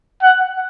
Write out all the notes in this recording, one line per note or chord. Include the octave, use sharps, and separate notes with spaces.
F#5